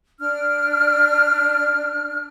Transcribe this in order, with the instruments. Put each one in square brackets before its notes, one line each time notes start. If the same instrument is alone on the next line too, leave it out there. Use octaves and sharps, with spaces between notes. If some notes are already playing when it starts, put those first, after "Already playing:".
[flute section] D4 F6